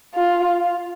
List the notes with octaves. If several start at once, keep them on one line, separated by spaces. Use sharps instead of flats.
F4